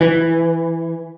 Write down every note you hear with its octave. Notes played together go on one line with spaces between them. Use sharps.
E3